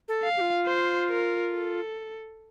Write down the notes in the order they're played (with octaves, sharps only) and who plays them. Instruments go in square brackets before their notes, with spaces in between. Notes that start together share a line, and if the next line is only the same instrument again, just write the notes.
[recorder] A4
[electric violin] F5
[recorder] G4
F4
[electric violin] C5
A#4
A4